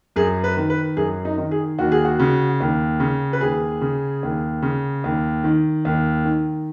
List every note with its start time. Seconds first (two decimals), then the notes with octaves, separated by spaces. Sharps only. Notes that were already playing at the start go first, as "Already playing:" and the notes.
0.16 F#2 G#4
0.44 B4
0.57 D#3
0.70 B4
0.97 F#2 G#4
1.25 D#4
1.38 D#3
1.51 G#4
1.78 D#2 F#4
1.92 G#4
2.05 F#4
2.20 C#3
2.60 D#2
3.00 C#3
3.33 B4
3.41 D#2 G#4
3.81 C#3
4.23 D#2
4.62 C#3
5.04 D#2
5.44 D#3
5.85 D#2
6.25 D#3